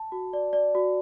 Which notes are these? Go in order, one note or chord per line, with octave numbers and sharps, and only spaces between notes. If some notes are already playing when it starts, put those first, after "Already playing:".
Already playing: A5
F#4
D5
D5
F#4